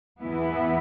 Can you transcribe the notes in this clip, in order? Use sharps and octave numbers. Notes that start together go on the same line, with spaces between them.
E2 E3 B3 E4